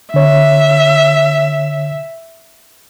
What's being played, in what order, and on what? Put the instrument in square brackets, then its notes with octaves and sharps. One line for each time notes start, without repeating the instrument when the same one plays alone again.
[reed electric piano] D3 C#5 [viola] E5